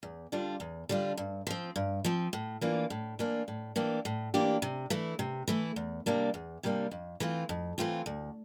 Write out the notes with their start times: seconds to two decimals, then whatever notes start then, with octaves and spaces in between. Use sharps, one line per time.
0.03 E2
0.32 D3 G3 D4 F4
0.60 E2
0.89 D3 G3 D4 F4
1.17 G2
1.47 F3 C4
1.76 G2
2.04 F3 C4
2.33 A2
2.61 E3 A#3 D4 F4
2.90 A2
3.19 E3 A#3 D4 F4
3.48 A2
3.76 E3 A#3 D4 G4
4.05 A2
4.34 E3 A#3 D4 G4
4.62 C3
4.90 E3 A3 E4
5.19 C3
5.48 E3 A3 E4
5.76 E2
6.06 C3 G3 A#3 D4
6.34 E2
6.63 C3 G3 A#3 D4
6.91 F2
7.20 E3 A3 C4 F4
7.49 F2
7.78 E3 A3 C4 F4
8.06 D2